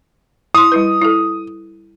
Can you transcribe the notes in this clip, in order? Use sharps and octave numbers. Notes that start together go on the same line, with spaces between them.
E4 C6 D#6
G3 E4 B4
E4 A4